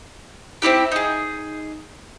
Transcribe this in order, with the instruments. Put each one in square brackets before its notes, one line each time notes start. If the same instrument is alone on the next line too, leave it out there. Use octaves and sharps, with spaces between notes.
[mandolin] C4 D#4 E4 G4
D#4 G#4